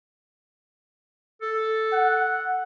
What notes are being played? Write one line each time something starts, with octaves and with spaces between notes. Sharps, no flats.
A4
F#5